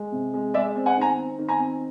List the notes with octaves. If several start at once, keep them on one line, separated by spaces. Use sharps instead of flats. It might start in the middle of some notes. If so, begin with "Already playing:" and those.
Already playing: G#3
C3
G#3
G#3 D5 E5
C4
F#5 G#5
D#3 G#5 A#5
C4
D#3
G#5 A#5
C4